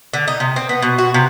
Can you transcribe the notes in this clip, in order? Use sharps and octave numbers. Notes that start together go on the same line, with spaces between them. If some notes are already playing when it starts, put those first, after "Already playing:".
D3
D#4
C3
C4
B3
B2
F#4
C3